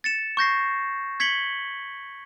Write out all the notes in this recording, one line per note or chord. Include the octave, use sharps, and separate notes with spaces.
A6 C#7 E7
C#6 G6 A#6 C7
G#6 B6 C#7 F#7 G7